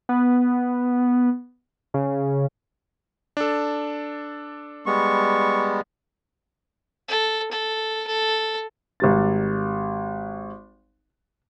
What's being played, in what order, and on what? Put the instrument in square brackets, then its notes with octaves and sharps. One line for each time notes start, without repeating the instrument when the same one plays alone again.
[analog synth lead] B3
C#3
[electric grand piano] D4 A4
[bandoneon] G3 G#3 B3 [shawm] C#6
[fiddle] A4
A4
A4
[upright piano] G#1 G3 A6